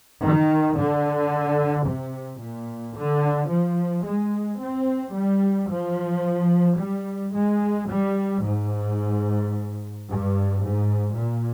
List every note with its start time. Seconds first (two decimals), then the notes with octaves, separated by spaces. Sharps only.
0.23 D#3
0.77 D3
1.87 C3
2.41 A#2
2.97 D3
3.50 F3
4.05 G#3
4.61 C4
5.14 G3
5.70 F3
6.79 G3
7.33 G#3
7.89 G3
8.43 G#2
10.07 G2
10.62 G#2
11.17 A#2